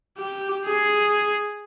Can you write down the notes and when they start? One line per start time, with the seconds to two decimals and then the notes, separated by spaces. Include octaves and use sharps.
0.18 G4
0.65 G#4